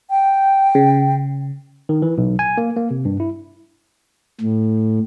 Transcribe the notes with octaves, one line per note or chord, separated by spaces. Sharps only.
G5
C#3
D#3
E3
B1
G#5
A#3
A#3
C3
G2
E4
A2